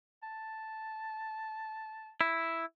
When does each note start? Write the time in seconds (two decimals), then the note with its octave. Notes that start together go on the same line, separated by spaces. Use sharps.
0.23 A5
2.21 E4